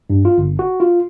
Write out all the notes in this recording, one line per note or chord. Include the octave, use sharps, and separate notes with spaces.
G2
F4
G1
F#4
F4